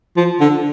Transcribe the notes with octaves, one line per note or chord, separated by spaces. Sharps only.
F3
D3